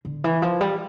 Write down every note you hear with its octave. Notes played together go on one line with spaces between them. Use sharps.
D3
E3
F3
G3